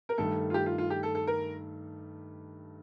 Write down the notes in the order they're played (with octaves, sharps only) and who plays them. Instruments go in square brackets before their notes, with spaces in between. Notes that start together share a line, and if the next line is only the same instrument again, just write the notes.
[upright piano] A#4
[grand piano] G2 D#3 A3 [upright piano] A4
[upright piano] F4
G4
F4
F4
G4
A4
A4
A#4